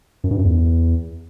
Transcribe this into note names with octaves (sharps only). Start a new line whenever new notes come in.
F#2
G2
F#2
E2